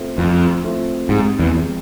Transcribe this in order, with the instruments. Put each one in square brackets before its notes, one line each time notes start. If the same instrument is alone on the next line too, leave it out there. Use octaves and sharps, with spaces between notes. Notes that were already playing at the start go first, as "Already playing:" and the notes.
Already playing: [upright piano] A3 C4 F4
[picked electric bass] F2 [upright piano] F3
[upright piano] A3 C4 F4
[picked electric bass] G#2 [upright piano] C3
[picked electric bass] E2
[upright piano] F3 G#3